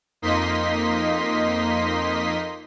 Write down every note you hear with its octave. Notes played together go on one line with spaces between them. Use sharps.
F2 A#3 D#4 D#5 C6 B6